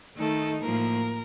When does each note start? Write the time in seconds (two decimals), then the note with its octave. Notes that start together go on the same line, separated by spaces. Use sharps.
0.18 D#3 A3 D#4 A4
0.61 A2 F3 A#3 A#4